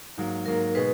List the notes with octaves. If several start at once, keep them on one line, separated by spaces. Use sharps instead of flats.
G#2 F#3 A#3
G#2 F#3 A#3 A#4
B2 G#3 D#4 G#4 B4